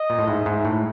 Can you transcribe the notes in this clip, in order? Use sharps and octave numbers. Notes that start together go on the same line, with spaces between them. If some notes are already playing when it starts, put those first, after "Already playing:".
Already playing: D#5
A#2
A2
G#2 E5
G#2
A2